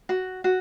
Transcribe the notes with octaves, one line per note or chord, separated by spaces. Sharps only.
F#4
F#4